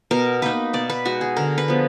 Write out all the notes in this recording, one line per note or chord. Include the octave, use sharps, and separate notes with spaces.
B2 A#4
A#3 D#4 B4
B2 D5
B4
G#3 D#4 F#4
G#4
D3 A#4
B4
F3 B3